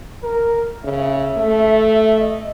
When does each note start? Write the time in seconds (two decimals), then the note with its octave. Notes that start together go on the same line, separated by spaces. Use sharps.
0.24 A#4
0.84 C#3 E5
1.37 A3
2.20 D#5